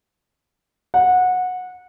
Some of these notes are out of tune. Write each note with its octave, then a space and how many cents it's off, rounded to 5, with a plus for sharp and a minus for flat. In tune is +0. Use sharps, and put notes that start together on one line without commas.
F#5 -20